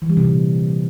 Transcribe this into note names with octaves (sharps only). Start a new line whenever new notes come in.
E3
G3
C3
A#2